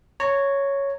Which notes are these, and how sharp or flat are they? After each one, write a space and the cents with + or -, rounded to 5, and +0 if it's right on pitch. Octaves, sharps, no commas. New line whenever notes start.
C#5 +0 A#5 -25